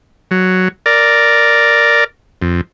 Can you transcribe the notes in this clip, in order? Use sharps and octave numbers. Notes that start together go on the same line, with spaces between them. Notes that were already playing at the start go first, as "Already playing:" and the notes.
F#3
A#4 D5
F2